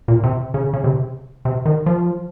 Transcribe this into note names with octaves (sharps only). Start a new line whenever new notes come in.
A#2
C3
C#3
C#3
C3
C3
D#3
F3